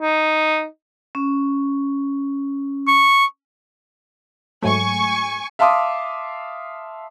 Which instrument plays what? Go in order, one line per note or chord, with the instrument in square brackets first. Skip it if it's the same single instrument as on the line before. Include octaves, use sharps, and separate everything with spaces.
[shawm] D#4
[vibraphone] C#4
[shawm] C#6
[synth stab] G#2 F#3 A3 [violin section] G#5 C#6
[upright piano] E5 F5 A5 C6 D6 D#6